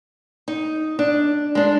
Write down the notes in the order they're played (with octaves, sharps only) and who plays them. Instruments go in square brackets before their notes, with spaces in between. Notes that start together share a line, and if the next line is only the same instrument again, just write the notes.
[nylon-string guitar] D#4
D4
G#3 D4